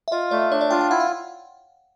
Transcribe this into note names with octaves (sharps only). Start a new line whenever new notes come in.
E5
F4 D#5
A3 D5
D4 C#5
D5
F4 G5
G5
E4 F#5
F5